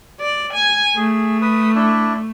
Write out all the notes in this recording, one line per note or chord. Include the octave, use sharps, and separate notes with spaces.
D5
G#5
A3 G#4
B4 D#6
D4 E4